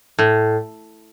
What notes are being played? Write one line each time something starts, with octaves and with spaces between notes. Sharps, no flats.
A2